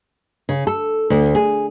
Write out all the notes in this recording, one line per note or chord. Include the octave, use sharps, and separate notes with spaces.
C#3
A4
D2
G#4